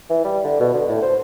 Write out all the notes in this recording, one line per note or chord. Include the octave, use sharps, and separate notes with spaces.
E3
G3
D3
B2
D3
A2
C5